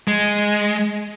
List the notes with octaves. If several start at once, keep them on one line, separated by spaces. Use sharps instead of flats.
G#3